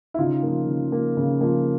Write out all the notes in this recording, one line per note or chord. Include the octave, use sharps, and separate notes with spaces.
E4
C#3 D#4 F4
F3 A#3
C#3
F3 A#3
C#3
F3 A#3